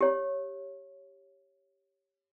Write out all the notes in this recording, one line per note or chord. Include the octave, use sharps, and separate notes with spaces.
G4 C#5